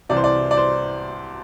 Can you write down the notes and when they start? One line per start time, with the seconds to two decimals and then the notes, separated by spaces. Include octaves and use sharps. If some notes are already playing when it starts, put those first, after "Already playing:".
0.09 C2 C3 E3 D5
0.17 C5
0.24 D5
0.51 D5
0.57 C5